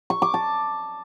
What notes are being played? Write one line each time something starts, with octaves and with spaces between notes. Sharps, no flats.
C#6
D6
A5